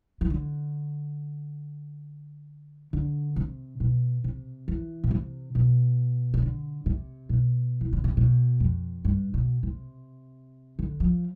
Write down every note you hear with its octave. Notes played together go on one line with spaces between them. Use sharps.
E3
D3
D3
C3
B2
C3
E3
B2
C3
B2
C3
D3
C3
B2
E3
D3
C3
B2
F2
G2
B2
C3
D3
F3